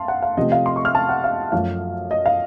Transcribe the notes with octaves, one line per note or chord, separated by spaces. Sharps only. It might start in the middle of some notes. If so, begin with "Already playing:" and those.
Already playing: F5 A5 C6
F#5
F5
C3 F3 A3 C4 D#5
F5
C6
C#6
F6
A5
F#5
F5
F#2 F3 A3 F5
D#5
F5